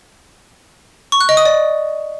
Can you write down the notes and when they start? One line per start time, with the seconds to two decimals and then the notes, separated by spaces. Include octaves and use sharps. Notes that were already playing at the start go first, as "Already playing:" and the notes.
1.12 C#6
1.21 F#6
1.29 D#5
1.37 D#6
1.45 D5